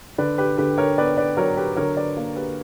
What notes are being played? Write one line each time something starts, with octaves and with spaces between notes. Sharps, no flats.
D3 B4 D5
G4 B4
D3 G4 B4
A#4 C#5
B3 B4 D5
B4 D5
F#3 A#4 C#5
G4 B4
D3 A#4 C#5
B4 D5
A#3
G4 B4